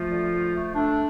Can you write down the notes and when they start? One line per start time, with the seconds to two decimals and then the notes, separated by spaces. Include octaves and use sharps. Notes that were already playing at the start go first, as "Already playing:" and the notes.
Already playing: F3 A3 F4
0.10 D3
0.31 A3
0.53 A3
0.75 A3 D4